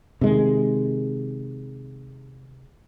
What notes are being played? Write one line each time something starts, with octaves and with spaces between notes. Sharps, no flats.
C3 D#3 G#3